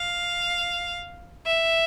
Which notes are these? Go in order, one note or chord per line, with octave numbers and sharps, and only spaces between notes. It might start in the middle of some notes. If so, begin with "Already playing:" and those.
Already playing: F5
E5